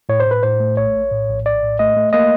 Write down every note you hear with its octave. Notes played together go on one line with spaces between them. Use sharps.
A2 C#5
C5
A2
B4
A2 C5
A3
A#1 C#5
A#1
A2
A#1
A#1 D5
A2
A3 D#5
A3
A#3 D#5